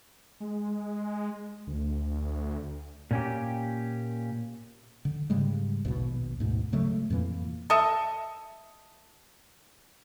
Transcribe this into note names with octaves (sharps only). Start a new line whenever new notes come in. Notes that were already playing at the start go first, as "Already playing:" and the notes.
G#3
D2
A#2 C#4 G4
D3
G#2 C#3 G3 G#3
A#1 D#2 B2
D2 G#2 B2
C#3 F#3 G#3 A3
F2 A#2 E3 A#3
A4 D#5 E5